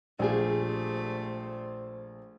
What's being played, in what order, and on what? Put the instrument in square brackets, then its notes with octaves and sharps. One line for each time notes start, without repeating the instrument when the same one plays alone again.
[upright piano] A#1 F4 G#5 [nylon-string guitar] G3 G4 G#4 [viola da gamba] A3 [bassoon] C5